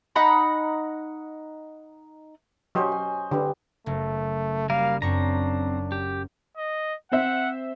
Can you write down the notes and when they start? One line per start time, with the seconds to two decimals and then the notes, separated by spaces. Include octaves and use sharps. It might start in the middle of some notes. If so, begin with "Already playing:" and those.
0.16 D#4 F#5 A#5 B5
2.75 F#3 C#4 G4 C5 D#5
2.92 G#5
3.31 D3 G3 C4 B4
3.86 F#1 A3
4.70 G3 A#3 A#4 F5
5.02 F#2 C4 D4 A#5 C#6
5.92 G4
6.57 D#5
7.12 C4 C5 E5 F#5